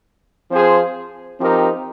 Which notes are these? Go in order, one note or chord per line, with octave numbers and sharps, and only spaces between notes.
F3 C4 F4 G#4 C5
F3 C4 D#4 G4 A#4